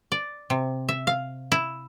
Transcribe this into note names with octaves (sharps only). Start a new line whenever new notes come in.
D5
C3
E5
F5
E4